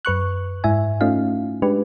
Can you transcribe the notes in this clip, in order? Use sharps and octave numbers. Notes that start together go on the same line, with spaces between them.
F#2 B4 C#6 F#6
G#2 E4 E5 G#5
A3 C#4 D#4 F4 F5
G#3 D4 G4 B4